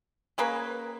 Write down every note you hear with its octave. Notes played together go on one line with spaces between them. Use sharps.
A#3 C#4 G#4 B4